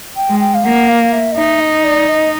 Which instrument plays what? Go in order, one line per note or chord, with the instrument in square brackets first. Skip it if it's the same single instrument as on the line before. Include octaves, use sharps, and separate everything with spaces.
[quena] G5
[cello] G#3
[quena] G5
F5
[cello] A#3 [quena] F#5
[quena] F5
E5
D#5
[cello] D#4 [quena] E5
[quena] D#5
D5
D#5